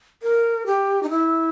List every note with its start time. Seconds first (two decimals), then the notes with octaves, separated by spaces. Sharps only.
0.23 A#4
0.66 G4
1.03 D#4
1.10 E4